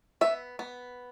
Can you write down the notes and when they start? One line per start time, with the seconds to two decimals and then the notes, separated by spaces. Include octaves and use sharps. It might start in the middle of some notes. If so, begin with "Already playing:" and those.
0.21 B3 E5
0.59 B3